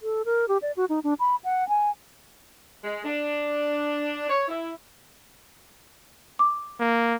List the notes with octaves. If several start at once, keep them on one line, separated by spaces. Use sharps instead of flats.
A4
A#4
G4
D5
F#4
D#4
D4
B5
F#5
G#5
G#3
D4
C#5
E4
D6
A#3